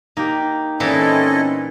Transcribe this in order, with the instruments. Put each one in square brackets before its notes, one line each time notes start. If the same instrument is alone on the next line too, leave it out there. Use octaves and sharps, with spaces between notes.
[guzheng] A#3 [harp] D#4 G4
[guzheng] A#2 E3 [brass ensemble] C4 C#4 [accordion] E4 A4 D#5